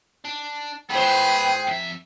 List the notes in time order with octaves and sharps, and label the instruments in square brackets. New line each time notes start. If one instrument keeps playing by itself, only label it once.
[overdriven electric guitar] D4
[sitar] G#2 C5 [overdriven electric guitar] B3 E4 [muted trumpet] G#4 [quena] G5
[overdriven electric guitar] F2 E5